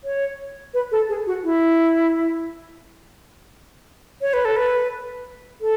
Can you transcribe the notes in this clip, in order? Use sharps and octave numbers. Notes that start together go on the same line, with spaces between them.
C#5
B4
A4
G#4
F#4
E4
C#5
B4
A4
B4
A4